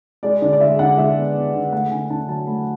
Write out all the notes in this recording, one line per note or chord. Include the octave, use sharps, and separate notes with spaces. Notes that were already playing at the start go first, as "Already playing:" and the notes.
G#3 D5
D3 D5
D5
G#3 E5
D3 F#5
G#3 E5
B3
B3
D3
A3 F#5
D3 G#5
D3 A5
F#3 A5
A3 B5